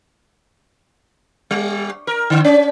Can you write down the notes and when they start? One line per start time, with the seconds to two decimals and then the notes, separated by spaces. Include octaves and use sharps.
1.51 G3
2.07 A#4
2.30 D3
2.45 C#4